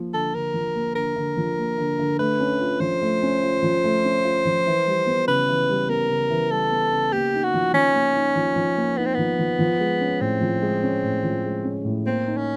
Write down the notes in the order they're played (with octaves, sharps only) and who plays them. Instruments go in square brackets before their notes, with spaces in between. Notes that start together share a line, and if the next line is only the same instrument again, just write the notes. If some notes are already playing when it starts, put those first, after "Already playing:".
Already playing: [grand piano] F3 A#3
[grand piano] D3 [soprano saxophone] A4
[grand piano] D3 [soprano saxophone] A#4
[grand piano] F3
A#3
[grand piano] D3 [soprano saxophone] A#4
[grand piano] D3
F3
A#3
D3
D3
[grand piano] A3 [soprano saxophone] B4
[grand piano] C#4
F4
[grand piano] F3 [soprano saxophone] C5
[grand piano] A3
C#4
F4
F3
A3
C#4
F4
F3
E3
G3
B3
[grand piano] C#3 [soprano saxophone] B4
[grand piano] E3
G3
[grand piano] B3 [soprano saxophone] A#4
[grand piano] C#3
E3
[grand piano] G3 [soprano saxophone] A4
[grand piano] B3
C#3
[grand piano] A#3 [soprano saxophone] G4
[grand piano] D#4
[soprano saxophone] F#4
[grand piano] F3
[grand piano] F3 [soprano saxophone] C#4
[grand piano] A#3
D#4
F3
F3
A#3
[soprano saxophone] B3 [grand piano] D#4
[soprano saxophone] C4
[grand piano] F3 [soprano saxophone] B3
[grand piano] F3
F3
G#3
C#4
[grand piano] A2 [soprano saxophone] C4
[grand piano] F3
G#3
C#4
A2
F3
G#3
C#4
A2
[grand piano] A#3 [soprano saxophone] C4
[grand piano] D#4
[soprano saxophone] C#4